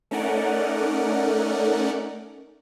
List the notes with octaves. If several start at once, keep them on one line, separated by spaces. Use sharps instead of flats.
A3 C#4 D#4 A#4 D5 F#5